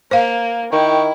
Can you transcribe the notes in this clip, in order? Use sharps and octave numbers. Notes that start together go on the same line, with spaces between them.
A#3 C5 F5
D#3 E4 G5 C#6